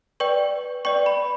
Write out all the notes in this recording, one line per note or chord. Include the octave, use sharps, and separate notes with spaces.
B4 D5 G5 C#6
B4 D5 G5 C#6
B5